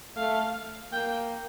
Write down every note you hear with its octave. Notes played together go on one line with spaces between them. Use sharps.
A3 F5
A#3 G5